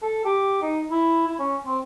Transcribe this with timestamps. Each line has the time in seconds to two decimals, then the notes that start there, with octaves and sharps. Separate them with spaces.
0.02 A4
0.25 G4
0.62 D#4
0.91 E4
1.27 E4
1.39 C#4
1.66 C4